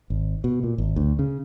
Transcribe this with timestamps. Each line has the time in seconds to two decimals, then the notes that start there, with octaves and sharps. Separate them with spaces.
0.10 G#1
0.44 B2
0.64 A#2
0.78 G#1
0.96 D2
1.19 C#3